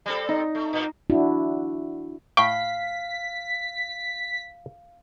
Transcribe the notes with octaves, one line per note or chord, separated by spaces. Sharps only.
G3 C4 A4
D#4
A3
A#2 A#3
D4 E4 F#4
A2 F5 G5 C#6 B6